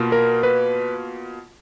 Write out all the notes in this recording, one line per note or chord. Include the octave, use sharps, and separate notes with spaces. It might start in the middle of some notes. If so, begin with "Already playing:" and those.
Already playing: B2 A#3 F4
A#4
B4